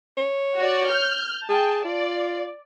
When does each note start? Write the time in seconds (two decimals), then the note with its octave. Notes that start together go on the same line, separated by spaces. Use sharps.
0.17 C#5
0.58 F#4 D5
0.89 F6 G6
1.49 G#4 G5 A5
1.85 F4 D5